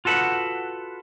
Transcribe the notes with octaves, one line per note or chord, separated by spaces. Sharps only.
F4 F#4 A4 B4 F#5